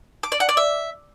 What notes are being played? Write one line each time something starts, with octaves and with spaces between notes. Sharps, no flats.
D6
D5
F#5
D5
E5